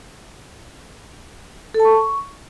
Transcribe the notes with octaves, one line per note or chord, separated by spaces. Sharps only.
A4
A5
C#6